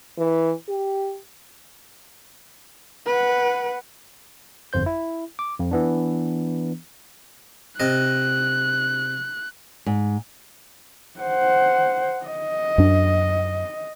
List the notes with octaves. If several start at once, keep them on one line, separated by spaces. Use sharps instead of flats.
E3
G4
B4 F#5
G1 F2 C5 G6
E4
D6
F2
E3 B3 D4
C3 D#5 F#6
G#2
C5 F#5
D#5
F#2 D4